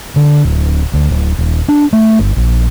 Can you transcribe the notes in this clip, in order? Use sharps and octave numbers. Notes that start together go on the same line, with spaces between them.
D3
D1
D2
D1
D#1
D4
A3
G1
A#1